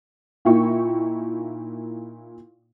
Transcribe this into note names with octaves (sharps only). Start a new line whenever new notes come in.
A#2 A#3 D#4 E4 G5 C#6